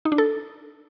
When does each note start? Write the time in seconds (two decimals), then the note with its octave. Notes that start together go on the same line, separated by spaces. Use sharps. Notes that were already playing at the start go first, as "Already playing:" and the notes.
0.05 D#4
0.12 D4
0.18 A4